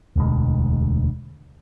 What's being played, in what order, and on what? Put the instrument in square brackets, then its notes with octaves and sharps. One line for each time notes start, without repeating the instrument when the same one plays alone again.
[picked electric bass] E1 D2 B2 G#3